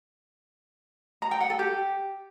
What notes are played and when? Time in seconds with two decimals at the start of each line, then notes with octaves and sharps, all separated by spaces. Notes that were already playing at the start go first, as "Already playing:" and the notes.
1.22 A#5
1.31 G5
1.41 F#5
1.50 A4
1.59 G4